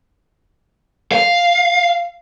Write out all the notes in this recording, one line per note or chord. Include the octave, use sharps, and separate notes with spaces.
F5